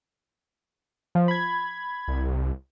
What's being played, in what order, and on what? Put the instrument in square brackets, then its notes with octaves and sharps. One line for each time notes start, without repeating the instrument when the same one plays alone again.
[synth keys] F3
B5 G#6
[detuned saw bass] C2